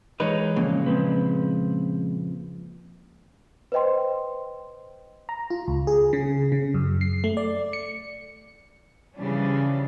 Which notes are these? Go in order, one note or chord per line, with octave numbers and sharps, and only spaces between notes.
E3 G#3 D#4 B4 C#5
F2 A#2 C#3
G#3 C4 B4
B4 C5 D#5 G5 C6
A#5
F4
C#2
G#4
C#3
C#3
F#2
C7
A3
D5
C#7
C#3 E3 F3 G3 C#4 D4